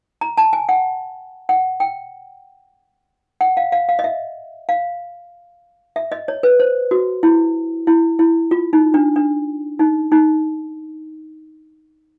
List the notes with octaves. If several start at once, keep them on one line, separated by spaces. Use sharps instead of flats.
A#5
A5
G#5
F#5
F#5
G5
F#5
F5
F5
F5
D#5
E5
F5
E5
D#5
C#5
B4
C5
F#4
E4
E4
E4
F4
D#4
D4
D4
D#4
D#4